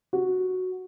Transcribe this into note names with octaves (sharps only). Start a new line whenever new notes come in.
F#4